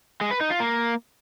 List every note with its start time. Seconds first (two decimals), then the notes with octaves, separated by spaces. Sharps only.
0.21 G#3
0.31 B4
0.41 D#4
0.50 F4
0.60 A#3